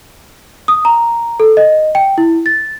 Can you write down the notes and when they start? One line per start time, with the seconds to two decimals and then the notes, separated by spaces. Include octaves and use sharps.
0.68 D#6
0.85 A#5
1.40 A4
1.57 D#5
1.95 G5
2.18 E4
2.46 A6